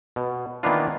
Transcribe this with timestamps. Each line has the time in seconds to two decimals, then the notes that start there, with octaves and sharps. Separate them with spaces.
0.16 B2
0.63 D#3 E3 A#3 B3 D4 F4